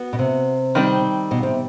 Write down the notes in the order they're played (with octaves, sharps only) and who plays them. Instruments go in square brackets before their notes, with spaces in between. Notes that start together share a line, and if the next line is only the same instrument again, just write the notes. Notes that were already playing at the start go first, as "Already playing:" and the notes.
Already playing: [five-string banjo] B3 F#4
[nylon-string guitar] B2
C3
[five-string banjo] D#3 G3 C4
[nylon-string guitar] B2
C3